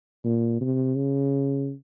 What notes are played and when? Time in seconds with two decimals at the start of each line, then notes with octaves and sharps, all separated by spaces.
0.24 A#2
0.61 C3
0.96 C#3